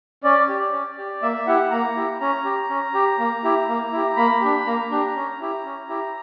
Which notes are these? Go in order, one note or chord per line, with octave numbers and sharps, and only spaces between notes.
C#4 D5
G4
C#4
G4
A#3 E5
E4 G4 F#5
A#3 A#5
E4 G4
C#4 A#5
G4
C#4
G4
A#3
E4 G4
A#3
E4 G4
A#3 B5
D4 G4
A#3 A#5
D4 G4
C#4
E4 G4
C#4
E4 G4